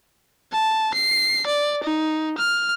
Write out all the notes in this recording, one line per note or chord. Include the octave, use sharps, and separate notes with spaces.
A5
C7
D5
D#4
F6